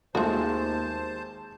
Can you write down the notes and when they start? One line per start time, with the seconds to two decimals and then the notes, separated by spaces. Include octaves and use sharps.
0.15 G#1 D#2 G#3 A3 F4 F#4 C5 A5